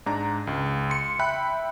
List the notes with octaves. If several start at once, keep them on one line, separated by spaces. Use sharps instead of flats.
G#2 D4 A#5
C#2
C6 C#7
E5 G5 B5 F#6